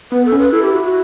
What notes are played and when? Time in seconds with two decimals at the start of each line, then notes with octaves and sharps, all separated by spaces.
0.12 B3 B4
0.25 A4
0.32 C#4
0.39 B4
0.52 E4 A4
0.62 G4
0.72 F#4
0.83 F#4